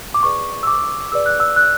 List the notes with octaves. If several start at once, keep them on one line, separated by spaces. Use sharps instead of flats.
D6
G#4 B4 D5 C#6
E6
D6
G#4 B4 D5 E6
F#6
E6
F#6